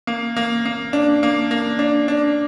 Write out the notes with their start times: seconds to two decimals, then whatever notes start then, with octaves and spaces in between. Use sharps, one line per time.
0.07 A#3
0.37 A#3
0.66 A#3
0.93 D4
1.23 A#3
1.51 A#3
1.79 D4
2.08 D4